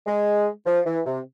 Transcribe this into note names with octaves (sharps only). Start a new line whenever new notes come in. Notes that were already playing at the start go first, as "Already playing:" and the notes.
G#3
F3
E3
C3